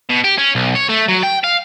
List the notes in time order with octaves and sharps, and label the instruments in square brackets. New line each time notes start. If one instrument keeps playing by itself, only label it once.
[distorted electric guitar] B2
G4
C#4
B1
C#5
A3
F#3
G5
F5